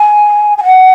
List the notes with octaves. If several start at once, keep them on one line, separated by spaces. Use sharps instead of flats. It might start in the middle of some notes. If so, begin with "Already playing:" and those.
Already playing: G#5
G#5
F#5